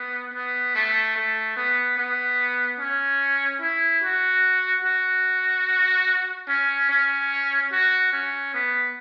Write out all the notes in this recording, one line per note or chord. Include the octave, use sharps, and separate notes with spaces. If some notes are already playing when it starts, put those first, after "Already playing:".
Already playing: B3
B3
A3
A3
B3
B3
C#4
E4
F#4
F#4
C#4
C#4
F#4
C#4
B3